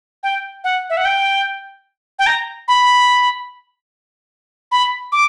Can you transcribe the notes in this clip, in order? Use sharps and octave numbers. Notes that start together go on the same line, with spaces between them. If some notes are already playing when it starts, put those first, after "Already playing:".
G5
F#5
E5
F#5
G5
G5
A#5
B5
B5
D6